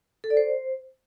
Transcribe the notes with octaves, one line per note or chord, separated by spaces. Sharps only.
A4
D5
C5